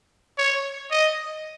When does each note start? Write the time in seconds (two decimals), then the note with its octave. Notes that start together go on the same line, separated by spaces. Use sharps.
0.38 C#5
0.91 D#5